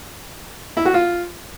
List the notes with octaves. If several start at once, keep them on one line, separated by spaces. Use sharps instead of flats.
E4
F#4
F4